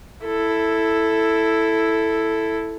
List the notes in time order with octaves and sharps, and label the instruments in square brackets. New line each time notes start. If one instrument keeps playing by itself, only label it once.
[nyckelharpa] E4 A4